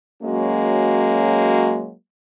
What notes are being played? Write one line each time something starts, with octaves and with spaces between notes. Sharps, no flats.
F#3 G#3 A#3 C#4 F#4